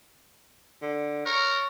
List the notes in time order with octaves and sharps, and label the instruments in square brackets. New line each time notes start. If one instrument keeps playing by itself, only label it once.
[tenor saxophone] D3
[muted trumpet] A#4 [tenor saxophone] C#5